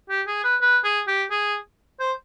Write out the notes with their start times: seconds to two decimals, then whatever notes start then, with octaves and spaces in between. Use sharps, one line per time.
0.10 G4
0.27 G#4
0.44 B4
0.61 B4
0.84 G#4
1.08 G4
1.31 G#4
2.00 C5